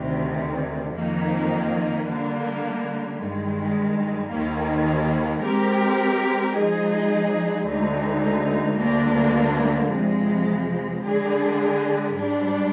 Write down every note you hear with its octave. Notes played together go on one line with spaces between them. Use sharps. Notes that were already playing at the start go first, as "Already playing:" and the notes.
Already playing: D2 C3 D#3
F2 D#3 A#3 D#4
D3 G3 A#3
G2 D#3 G#3
D#2 D#3 A#3
G#3 C4 G4 A#4
F3 G#3 D#4 G#4 D#5
D2 D3 G#3 D#4
D2 D3 G3 A#3 D4
F2 C3 F3 G#3
D3 G#3 D4 G#4
G#2 G3 D4